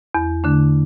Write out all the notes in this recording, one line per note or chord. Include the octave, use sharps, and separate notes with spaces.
E2
D3 A3 D4